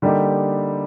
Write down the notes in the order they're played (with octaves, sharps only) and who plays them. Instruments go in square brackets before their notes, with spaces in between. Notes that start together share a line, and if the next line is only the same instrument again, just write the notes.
[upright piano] D3 G3 A#3 D#4 G4